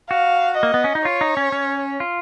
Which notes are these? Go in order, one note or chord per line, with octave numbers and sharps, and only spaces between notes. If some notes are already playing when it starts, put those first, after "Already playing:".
F#4 F5
D#5
A#3
B3
C#4
D#4
F4 C#5
D#4
C#4
C#4
F4